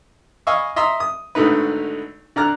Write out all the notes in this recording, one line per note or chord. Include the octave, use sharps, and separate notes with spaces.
D#5 F5 G#5 B5 C#6 E6
D#5 E5 A#5 C6 E6
D#6
G#1 D3 A3 D#4 B4
D3 D5 A#5 F6 F#6